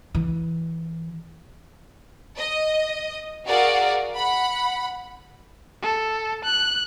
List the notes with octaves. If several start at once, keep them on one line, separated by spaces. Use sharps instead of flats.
E3
D#5
F#4 G#4 A#4 D5 F5 F#5
F#5 B5
A4
F#6